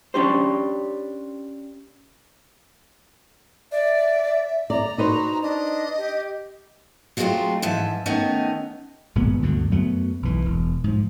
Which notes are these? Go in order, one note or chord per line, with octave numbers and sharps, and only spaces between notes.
C#4 D4 G4 C5
D5 E5
D5 A#5
D#4 F#4 B4 C5
D4 D#5
G4
F#3 G#3 A3 B3 C4 F4
G#2 E3 F3 E5
D#3 A3 B3 C#4 D#4
G1 A#2 G#3 B3
D2 G2 B2 D3
F#2 F#3 A3 B3
B1 E3
E1
G#2 F3